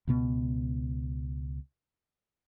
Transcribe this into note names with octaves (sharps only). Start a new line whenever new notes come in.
C#2 B2 B3